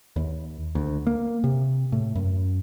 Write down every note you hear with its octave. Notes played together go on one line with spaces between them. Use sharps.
D#2
D2
A#3
C3
A2
F#2